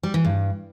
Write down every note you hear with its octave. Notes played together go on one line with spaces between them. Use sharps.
G3
E3
G2